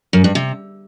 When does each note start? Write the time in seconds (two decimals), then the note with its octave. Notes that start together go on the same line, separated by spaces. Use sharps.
0.13 F#2
0.24 G2
0.35 C3